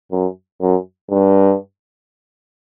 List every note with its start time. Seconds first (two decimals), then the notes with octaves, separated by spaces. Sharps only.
0.11 F#2
0.61 F#2
1.10 G2